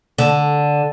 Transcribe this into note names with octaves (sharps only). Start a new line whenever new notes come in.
D3